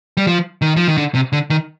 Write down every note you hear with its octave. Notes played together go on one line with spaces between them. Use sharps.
G3
F3
D#3
F3
D#3
D3
C3
D3
D#3